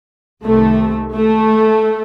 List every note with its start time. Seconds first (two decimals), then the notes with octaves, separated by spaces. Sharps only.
0.45 C2 C3 D#3 A3
1.15 A3